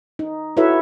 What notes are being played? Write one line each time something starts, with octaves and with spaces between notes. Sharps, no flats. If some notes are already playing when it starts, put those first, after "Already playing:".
D#4
E4 F#4 A4 B4 C#5 E5